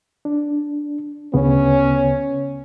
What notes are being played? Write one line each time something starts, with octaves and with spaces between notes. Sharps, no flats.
D4
D2 C#3 B3 C#4